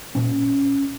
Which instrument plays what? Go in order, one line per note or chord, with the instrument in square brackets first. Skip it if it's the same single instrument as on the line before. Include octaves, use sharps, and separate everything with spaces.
[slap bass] A#2 C#4